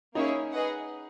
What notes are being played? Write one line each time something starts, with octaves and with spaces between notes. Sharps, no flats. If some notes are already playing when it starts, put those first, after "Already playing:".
A#3 C#4 D#4 E4 G#4 C#5
G#4 B4 D#5 F#5